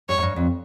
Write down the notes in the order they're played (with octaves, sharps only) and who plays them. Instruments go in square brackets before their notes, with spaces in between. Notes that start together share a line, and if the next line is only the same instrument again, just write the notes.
[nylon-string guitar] G2 [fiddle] C#5
[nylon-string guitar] G#2
G2
F2